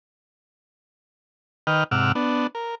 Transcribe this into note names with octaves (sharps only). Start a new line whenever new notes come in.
D#3 B4 D#5 G5 F6
G#2 C3 F#5 D6 E6 F6
B3 D4
A#4